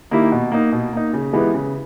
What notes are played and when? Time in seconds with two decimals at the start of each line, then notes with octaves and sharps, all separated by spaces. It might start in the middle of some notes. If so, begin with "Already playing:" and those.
0.11 D#3 A#3 E4 G4
0.32 B2
0.52 A#3 D#4
0.72 B2
0.93 A#3 D#4
1.13 C#3
1.33 E3 G#3 B3 G4
1.54 C#3